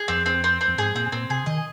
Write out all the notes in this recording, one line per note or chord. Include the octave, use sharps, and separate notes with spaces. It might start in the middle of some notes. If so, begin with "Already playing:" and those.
Already playing: G#4
F2 C4
C4
C4
C4
F2
G#2 G#4
A#2 C4
A#2 C4
C3 G#4
D#3 D#5